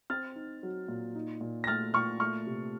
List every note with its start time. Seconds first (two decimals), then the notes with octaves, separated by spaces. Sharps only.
0.10 C4 F6 A6
0.36 D#4
0.63 F#3
0.88 A#2
1.15 D#4
1.41 A#2
1.64 A#6
1.67 A3 F6 A6
1.94 A#2 C#6 F6
2.20 A3 C#6 F6
2.46 C3